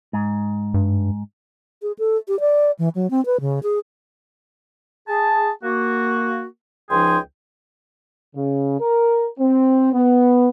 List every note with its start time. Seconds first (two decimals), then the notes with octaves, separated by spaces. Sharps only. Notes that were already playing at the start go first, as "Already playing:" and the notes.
0.13 G#2
0.74 G2
1.82 G#4
1.99 A4
2.28 G4
2.40 D5
2.79 E3
2.95 F#3
3.11 C4
3.26 B4
3.41 C#3
3.63 G#4
5.08 G#4 A5
5.63 A#3 F#4
6.91 C#2 F3 D#4 G#4 G5 C6
8.35 C#3
8.79 A#4
9.39 C4
9.93 B3